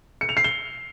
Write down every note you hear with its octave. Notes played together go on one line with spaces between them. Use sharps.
C#7
F7
C7
G7